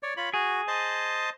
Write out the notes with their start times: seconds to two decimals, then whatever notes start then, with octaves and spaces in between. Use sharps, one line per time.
0.03 C#5 D5
0.17 F4 C#5 B5
0.34 F#4 G#4
0.68 C5 D#5 A5